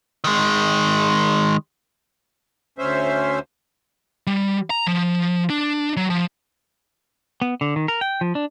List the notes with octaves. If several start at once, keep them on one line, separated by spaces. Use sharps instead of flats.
D#3 G#3
D2 C#4 C5 E5
G3
A#5
F3
D4
F#3
F3
B3
D3
D#3
A#4
G5
F3
D4